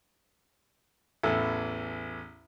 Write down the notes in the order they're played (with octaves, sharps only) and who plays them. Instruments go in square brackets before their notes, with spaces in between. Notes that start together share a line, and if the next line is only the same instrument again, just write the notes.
[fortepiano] A1 E2 E3 A4